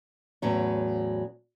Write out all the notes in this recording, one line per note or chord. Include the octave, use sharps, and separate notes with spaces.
E2 A2 F#3 C#4